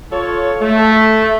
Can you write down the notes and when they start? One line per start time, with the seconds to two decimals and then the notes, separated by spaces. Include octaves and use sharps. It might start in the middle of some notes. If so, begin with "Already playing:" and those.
0.12 F4 A4 C#5
0.61 A3